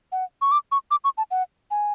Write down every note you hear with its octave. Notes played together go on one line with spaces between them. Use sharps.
F#5
C#6
D6
C#6
D6
C#6
A5
F#5
G#5